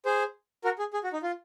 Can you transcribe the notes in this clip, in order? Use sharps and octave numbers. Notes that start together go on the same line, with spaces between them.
G#4 C5
F#4 A#4
G#4
G#4
F#4
D#4
F4